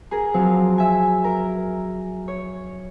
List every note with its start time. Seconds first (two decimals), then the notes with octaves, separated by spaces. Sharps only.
0.11 G#4 A#4
0.34 F3 F#3 C4
0.78 E5 G#5
1.24 A#4
2.28 C#5